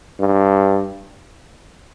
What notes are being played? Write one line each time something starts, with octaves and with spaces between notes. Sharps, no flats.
G2